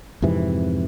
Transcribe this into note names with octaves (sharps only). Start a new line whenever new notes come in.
F2 G#2 C3 E3